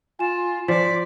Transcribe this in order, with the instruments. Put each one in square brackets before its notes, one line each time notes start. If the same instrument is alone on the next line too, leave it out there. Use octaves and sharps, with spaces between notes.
[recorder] F4 [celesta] G#5 E7
[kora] F3 [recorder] D5 [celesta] B6